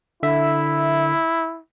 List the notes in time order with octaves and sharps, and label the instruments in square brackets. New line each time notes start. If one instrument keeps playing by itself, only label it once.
[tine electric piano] D3 E5 [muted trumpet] E4